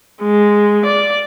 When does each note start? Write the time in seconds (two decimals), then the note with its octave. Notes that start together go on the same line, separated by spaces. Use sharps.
0.22 G#3
0.86 D5